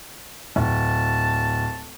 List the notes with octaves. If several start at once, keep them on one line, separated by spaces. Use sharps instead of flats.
D1 A5